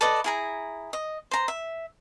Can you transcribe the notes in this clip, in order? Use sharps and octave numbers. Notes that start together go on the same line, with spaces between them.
A4 B4 D5 D#5
E4 G#4 A#5
D#5
C5 A#5
E5